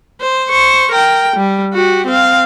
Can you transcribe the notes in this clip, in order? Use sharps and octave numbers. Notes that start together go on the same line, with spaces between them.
C5
C5 C#6
A#4 G5
G3
F#4 G4
C4 F5